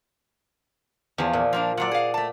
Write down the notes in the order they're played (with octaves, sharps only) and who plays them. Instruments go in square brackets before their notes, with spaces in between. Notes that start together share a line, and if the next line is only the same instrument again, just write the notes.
[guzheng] E2 F3
A#2
[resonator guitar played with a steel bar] F3 A#3 D4
[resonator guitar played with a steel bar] A#2 F#3 [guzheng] D5 F#5
[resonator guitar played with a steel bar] G#4 F5
A3 A5